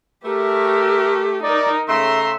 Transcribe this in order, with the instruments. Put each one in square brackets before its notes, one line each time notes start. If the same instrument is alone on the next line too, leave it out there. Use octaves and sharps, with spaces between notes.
[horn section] A3 [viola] G4 [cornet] A#4
[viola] D#4 A#4 [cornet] D5
[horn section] C#3 A3 C6 [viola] E5 [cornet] A#5